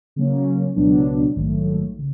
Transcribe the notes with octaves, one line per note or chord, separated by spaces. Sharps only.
C#3 F#3 A#3 C#4
C#2 B2 F#3 B3 D4
A#1 G#2 D#3 F#3 A3
C#3